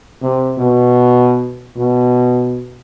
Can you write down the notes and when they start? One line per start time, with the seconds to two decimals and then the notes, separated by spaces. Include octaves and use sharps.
0.22 C3
0.58 B2
1.77 B2